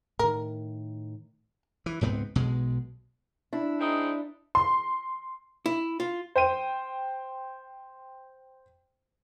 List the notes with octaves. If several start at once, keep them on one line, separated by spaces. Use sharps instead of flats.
A2 D#3 A#4
E3
C#2 G#2 B3 C4
B1 B2 G#3
D4 E4
G#3 C4 D#4
C6
E4
F4
C5 G5 D#7